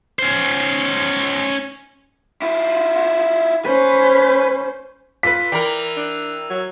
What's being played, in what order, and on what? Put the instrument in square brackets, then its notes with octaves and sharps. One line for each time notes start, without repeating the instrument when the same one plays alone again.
[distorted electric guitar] C#4 C5
[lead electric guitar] E4 F4
[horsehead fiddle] C#4 C5 [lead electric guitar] B4
[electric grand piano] F4 A4 B4 [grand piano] B6
[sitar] E3 A#4 [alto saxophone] D5 [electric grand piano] G5 A#5
[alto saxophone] D4
F#3